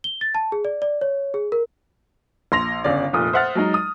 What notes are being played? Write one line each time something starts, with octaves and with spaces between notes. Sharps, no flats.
G7
A6
A5
G#4
D5
D5
C#5
G#4
A#4
A#1 C6 A#6 F7
G1 C#3 D5
F1 A#2 D#6
C5 E5 F#5 F6 A6
F#3 G#3 D#4
D#6